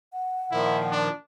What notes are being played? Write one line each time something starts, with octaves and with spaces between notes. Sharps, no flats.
F#5
A#2 D#3 F3 E4
D4